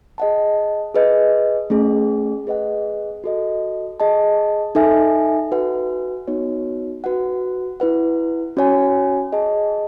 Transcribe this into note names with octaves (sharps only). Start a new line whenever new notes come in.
G#4 D#5 F#5 A5
G#4 B4 D#5
A3 C#4 G#4
G#4 B4 D#5 F#5
F#4 A4 D#5
G#4 D#5 A5
D#4 A4 E5 G#5
F#4 B4 F#5
B3 D#4 F#4 C#5
F#4 B4 F#5
E4 B4 F#5
C#4 F#4 C#5 G#5
G#4 D#5 A5